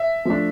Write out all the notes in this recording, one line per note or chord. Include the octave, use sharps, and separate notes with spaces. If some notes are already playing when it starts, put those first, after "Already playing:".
Already playing: E5
F3 A3 D4